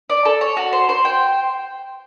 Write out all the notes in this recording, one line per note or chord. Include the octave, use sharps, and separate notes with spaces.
D5
A4
C#5
F#4
C5
C5
G5